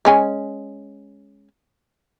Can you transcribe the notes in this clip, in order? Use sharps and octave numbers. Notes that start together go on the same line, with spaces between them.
G#3 C#4 G#5